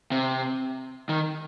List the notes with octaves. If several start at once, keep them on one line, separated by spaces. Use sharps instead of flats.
C3
D#3